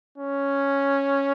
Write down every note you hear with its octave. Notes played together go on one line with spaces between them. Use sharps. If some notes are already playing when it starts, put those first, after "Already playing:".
C#4